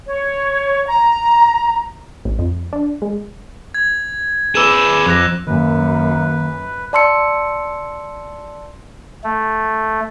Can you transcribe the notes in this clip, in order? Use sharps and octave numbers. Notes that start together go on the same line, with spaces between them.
C#5
A#5
A1
F2
D4
G#3
G#6
G#4 B4 D6 E6 E7
F2 D6 F#6 A#6
F#2 D#3 A#3 B4
D5 A5 C6 E6 C#7
A3